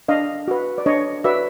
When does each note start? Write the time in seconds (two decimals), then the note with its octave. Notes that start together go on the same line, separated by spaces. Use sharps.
0.08 D4 D#5 F5
0.48 F#4 B4
0.78 D5
0.86 D4 C#5 D#5
1.24 F#4 B4 D5 E5